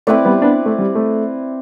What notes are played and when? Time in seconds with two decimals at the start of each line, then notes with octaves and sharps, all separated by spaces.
0.07 A3 C4 E4 B4 D5
0.25 G3 B3
0.42 B3 D4
0.66 A3
0.79 G3
0.95 A3